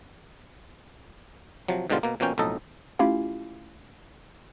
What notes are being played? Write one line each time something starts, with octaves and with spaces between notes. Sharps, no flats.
C3 F3 F#3
G#2 B2 D3 G3 F4
B2 A#3
B2 F3 A#3 C#4 G5
B1 F2 A2 A4 D#5 A#5
A3 C#4 E4 F4 G4 F5